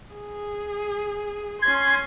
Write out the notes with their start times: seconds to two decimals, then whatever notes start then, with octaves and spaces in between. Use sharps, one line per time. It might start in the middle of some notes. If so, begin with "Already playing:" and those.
0.13 G#4
1.62 C#4 C6 G#6